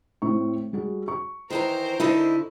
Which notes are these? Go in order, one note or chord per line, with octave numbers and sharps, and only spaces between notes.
A2 C4 C#6
G3 F#4 G#4
C#6
D#3 E3 A#4 C5 A#5
D3 D#4 E4